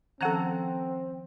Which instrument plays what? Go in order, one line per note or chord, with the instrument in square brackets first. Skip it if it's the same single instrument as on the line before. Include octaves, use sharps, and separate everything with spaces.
[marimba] D#3 F3 C#4 [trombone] C4 [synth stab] A4 F#5 A#5